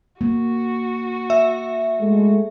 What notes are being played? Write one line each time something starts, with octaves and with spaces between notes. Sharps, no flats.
A#3 F#4
E5
G#3 A3